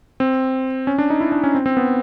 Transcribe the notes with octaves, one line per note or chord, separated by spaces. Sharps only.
C4
C#4
D4
D#4
E4
D4
C#4
C4
C4
B3